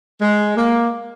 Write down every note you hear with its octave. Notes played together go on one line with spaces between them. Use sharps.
G#3
A#3